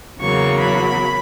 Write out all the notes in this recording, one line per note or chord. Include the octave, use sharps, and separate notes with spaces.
E2 C#3 F#3 A#3 C#6
B5